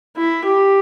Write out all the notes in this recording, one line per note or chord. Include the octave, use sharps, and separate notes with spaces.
E4
G4